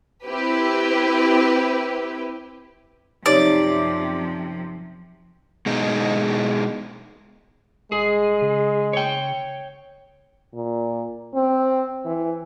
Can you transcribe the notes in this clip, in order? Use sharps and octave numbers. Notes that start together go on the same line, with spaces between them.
C4 E4 G4 B4
F#2 C3 F3 D#4 G4 C#5 D5
B2 G#3 D#4
D#1 G#3 G#4
C#3
C#5 G5
A#2
C4
E3